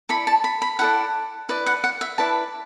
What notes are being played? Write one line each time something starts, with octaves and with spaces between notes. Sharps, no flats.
E4 A4 D5 B5
A5
B5
B5
E4 A4 D5 F#5
E4 B4 D5
F#5
F#5
E5
E4 B4 D5 A5